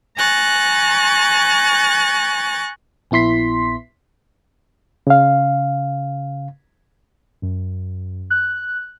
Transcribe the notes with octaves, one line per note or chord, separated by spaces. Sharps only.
G#5 A#5 C#6 F#6 A6
A#1 B3 E4 C6 B6
C#3 F5
F#2
F#6